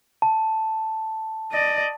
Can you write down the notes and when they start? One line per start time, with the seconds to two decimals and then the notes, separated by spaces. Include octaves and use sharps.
0.22 A5
1.53 D5 D#5